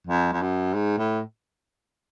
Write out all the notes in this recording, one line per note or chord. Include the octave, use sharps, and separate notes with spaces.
F2
F2
F#2
G#2
A2